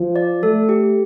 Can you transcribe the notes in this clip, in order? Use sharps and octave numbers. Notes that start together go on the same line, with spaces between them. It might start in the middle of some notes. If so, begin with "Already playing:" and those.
Already playing: F3
D5
A3 A4
G4